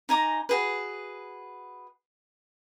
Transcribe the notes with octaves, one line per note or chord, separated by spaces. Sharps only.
D#4 G#5 A#5 D6
F#4 G#4 B4